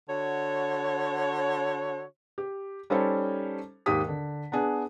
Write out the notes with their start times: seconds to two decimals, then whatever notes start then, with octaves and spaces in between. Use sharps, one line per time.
0.09 D3 F#4 C#5
2.38 G4
2.90 G3 C#4 D#4 A4 C5 C#5
3.86 D#2 G#2 G4 D#6 B6
4.08 D3
4.52 B3 D4 G#4